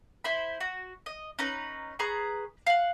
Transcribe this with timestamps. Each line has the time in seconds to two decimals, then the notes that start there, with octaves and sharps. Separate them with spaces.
0.24 E4 C5 B5
0.61 F#4
1.06 D#5
1.39 C#4 D#4 B4
1.99 G#4 B4 A#5 C#6
2.67 F5 F#5